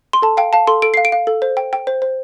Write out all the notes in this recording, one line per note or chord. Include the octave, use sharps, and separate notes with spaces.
C6
A4 A5
F5 G5
F5 A5
A4 C6
A4 D7
F5 C7
D7
F5
A4
C5
G5
G5
C5
C5